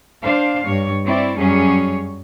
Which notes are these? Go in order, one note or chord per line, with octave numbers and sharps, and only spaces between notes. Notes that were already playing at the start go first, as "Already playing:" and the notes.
D4 C5 F5
G2 C#5
C4 E4 C#5 D5
F#2 F#3 G3 C#4 G#4 C#5